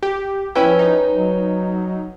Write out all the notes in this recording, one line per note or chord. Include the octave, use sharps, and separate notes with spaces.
G4
F3 C#4 E4 B4 G5
D#4
F#3